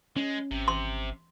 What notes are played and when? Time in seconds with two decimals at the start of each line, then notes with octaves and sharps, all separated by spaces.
0.16 G#3 C#4
0.51 G#1 C3
0.68 C6